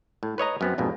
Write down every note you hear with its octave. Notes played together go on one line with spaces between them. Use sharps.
A2
B4 C#5 D#5 A#5
F#2 B3 C4
A#1 F2 G#2 B2